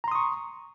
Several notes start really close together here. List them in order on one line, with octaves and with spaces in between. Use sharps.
A#5 C6 D#6 C#6